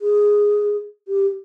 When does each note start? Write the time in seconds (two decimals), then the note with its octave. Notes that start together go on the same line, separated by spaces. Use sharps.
0.01 G#4
1.08 G4